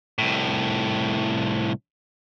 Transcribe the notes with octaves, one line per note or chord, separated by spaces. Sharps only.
C2 A2